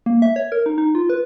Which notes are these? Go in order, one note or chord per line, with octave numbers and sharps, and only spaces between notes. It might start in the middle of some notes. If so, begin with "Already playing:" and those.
A#3
E5
C#5
A#4
D#4
D#4
F4
B4